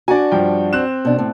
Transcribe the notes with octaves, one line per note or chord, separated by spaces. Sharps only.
D4 F#4 D5 G#5
G2 F3 G5
C4 F#6 E7
B2 D4
A2